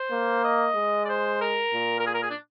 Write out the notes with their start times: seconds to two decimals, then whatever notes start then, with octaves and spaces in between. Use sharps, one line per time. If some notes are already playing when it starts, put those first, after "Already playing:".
Already playing: C5
0.11 A#3
0.44 D#5
0.76 G#3
1.05 D5
1.09 C5
1.41 A#4
1.73 A#2
1.99 A#4
2.06 G#4
2.14 A#4
2.22 G#4
2.30 D4